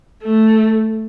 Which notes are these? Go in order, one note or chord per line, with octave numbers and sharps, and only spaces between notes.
A3